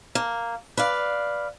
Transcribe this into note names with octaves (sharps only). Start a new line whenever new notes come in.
A#3
B4 D5 F5